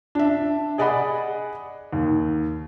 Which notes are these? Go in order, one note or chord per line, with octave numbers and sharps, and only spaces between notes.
D4 E5
G#4 D5 D#5 F#5 B5 D#6
D#2